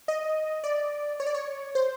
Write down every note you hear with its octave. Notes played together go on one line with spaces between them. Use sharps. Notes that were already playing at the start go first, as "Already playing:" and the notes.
D#5
D5
C#5
D5
C#5
C5